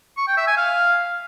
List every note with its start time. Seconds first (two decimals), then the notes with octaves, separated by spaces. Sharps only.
0.18 C#6
0.28 G5
0.37 E5
0.47 G#5
0.57 F5